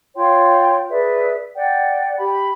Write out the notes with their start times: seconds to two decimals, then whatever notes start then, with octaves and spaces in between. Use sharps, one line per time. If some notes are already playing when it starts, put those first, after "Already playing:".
0.15 F4 C#5 G5 C6
0.89 G#4 B4 D5 E5
1.55 D5 F#5 G5
2.18 G4 B5